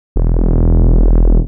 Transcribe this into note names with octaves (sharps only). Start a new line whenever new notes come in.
E1